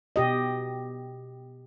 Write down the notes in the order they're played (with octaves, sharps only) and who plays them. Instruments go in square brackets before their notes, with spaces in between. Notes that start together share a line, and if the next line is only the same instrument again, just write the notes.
[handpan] B2 G4 D#5